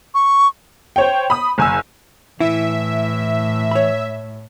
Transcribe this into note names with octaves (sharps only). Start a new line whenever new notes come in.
C#6
C5 C#5 G5
B5 D#6
F#1 G#5 E6
A2 E3 E4 E5
C#5 B5